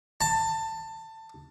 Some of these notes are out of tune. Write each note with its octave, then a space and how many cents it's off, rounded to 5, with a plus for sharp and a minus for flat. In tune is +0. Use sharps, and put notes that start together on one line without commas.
A5 +20